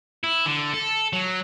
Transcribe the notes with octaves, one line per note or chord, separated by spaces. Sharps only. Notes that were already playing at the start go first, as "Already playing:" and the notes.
E4
D3
A4
F#3